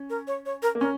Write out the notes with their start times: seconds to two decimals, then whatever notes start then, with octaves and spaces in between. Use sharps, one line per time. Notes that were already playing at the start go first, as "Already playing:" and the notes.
Already playing: C#4
0.10 A#4
0.27 C#5
0.45 C#5
0.62 A#4
0.75 A#3
0.81 C#4 A#4